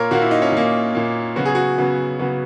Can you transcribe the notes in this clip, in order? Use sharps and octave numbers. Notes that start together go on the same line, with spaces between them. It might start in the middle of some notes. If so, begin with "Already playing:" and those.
Already playing: A#2 A#3 A#4 C#5
A#2 A#3 F#4
E4
D#4
C#4
A#2 A#3
A#2 A#3
C#3 F#3 B3 F#4
G#4
F#4
C#3 F#3 B3
C#3 F#3 B3